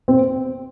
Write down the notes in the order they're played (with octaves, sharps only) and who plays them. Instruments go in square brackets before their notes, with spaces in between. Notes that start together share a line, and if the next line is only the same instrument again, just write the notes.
[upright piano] C4